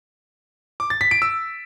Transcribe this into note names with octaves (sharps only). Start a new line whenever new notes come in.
D6
A6
B6
D7
E6